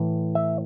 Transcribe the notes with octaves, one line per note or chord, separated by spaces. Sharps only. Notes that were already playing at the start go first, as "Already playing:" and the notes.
Already playing: A2 E3
E5